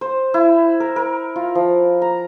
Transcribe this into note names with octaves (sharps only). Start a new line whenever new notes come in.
C5
E4
A#4
A#4
F4
F3
A#5